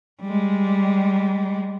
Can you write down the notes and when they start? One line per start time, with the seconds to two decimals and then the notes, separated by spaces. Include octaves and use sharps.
0.21 G3 G#3